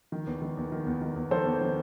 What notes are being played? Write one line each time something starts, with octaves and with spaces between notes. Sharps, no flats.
D#3
E2
D#3
E2
D#3
E2
D#3
E2
D#3 A4 C5
E2
D#3